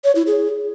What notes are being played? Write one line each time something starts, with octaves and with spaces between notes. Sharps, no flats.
C#5
E4
G#4